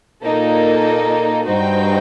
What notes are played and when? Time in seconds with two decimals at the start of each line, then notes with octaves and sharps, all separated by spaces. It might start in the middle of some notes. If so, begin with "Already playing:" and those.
0.23 A#2 A#3 D#4 A4
1.47 G2 D#4 F#4 C5 G5